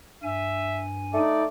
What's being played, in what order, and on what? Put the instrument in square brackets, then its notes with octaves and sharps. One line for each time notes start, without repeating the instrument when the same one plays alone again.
[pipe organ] G2 G#5 [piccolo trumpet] E5
[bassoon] A3 [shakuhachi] D#4 [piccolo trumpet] D5